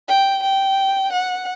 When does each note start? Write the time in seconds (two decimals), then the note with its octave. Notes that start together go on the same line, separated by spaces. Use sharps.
0.08 G5
0.43 G5
1.12 F#5